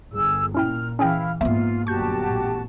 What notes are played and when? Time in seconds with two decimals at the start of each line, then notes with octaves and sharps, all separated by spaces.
0.13 G1 G#4 E6
0.54 A#2 C#4 E4 G5 F6
0.99 E3 C#4 E4 G#4 F5 G5 F6
1.41 G#2 A#3 B3 F4 E5
1.87 G1 F#2 A#2 F#4 G4 A5 C#6 G6
2.31 A1